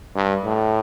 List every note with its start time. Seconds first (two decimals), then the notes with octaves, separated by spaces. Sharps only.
0.16 G2
0.45 A2